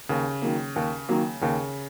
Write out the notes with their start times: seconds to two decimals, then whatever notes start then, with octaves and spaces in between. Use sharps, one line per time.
0.09 D#2 C#3
0.42 D#3 F#3 A#3
0.76 D#2
1.09 D#3 F#3 A#3
1.41 D#2 C#3